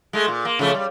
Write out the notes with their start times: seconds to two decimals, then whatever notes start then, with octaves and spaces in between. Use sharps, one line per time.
0.13 G#3 A3
0.28 A#2
0.45 A#3
0.59 C#3 F3 A3
0.74 G3